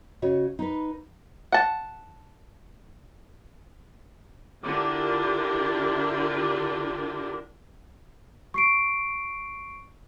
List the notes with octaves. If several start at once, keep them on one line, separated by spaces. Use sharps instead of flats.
C#3 F#4 C#5 D#5
D#4 B4
F#5 A5
D3 D4 E4 F4 G4 A#4
C#6 C7 D7